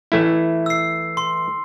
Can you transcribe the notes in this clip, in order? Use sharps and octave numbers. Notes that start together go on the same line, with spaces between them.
E3 A3 E4
E6 C7
C6